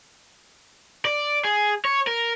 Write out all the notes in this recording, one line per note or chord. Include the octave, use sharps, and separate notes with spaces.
D5
G#4
C#5
A#4